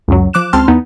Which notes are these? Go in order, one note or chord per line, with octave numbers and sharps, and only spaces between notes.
C#2 F#2 F#3
F3 D6 F#6 E7
C#2 C4 A5 C6 F6
E2 B3 D#4